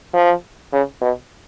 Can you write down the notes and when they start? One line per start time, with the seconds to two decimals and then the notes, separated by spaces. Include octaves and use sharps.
0.13 F3
0.72 C#3
1.01 B2